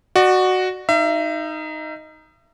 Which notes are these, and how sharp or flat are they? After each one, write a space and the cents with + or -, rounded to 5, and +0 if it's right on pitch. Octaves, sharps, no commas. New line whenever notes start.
F#4 +0 D5 +35
D#4 +0 E5 +35